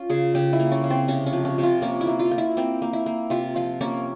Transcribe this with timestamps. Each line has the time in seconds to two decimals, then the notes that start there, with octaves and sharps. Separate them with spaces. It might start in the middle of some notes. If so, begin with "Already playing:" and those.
Already playing: C#4 F4
0.10 C#3 G#4
0.35 C#3 G4
0.53 E4
0.60 A#3
0.72 C#4
0.84 C#3
0.90 C4
1.08 C3 C#4
1.26 C#4
1.33 F3
1.45 C#4
1.58 C3
1.63 F4
1.82 A#3 C#4
2.01 E4
2.07 A#3
2.19 F4
2.31 A#3
2.38 E4
2.57 A#3 C4
2.82 A#3
2.93 E4
3.06 A#3
3.30 C3 F4
3.56 F3 F4
3.81 A#3 C#4